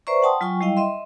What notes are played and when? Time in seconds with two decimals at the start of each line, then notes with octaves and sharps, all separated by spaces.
0.07 B4 C5 D5 E5 A#5 C#6
0.22 F#5 G5 A5 C6 D#6
0.41 F#3 F4 G5 G#5 C#6
0.61 G3 E4 D#5 F5 G5
0.77 D#5 E5 C6